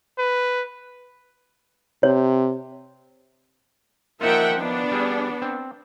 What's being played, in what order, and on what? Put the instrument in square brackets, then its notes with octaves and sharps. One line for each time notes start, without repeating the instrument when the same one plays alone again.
[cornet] B4
[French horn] C3 [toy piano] C#5
[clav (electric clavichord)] F3 D#4 F4 [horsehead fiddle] A#3 [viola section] E5 F#5 G5
[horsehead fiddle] B3 [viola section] D4
[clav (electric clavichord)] G3 G#4
C4